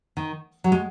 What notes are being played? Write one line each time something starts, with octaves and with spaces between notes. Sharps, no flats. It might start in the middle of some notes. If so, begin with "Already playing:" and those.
D#3
F#3
G#3